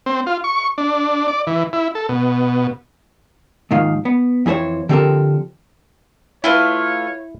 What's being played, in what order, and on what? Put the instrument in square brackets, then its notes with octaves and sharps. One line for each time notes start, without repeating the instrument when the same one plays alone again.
[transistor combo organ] C4
F4
C#6
D4
D5
E3
E4
A4
B2
[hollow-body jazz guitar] D#2 G#2 D#3 F3 F5
B3
F2 E3 G#4 C5 C#5
D3 F3 C4 G4 A4 A#4
[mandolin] A3 F4 B4 [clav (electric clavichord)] E4 [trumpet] C#5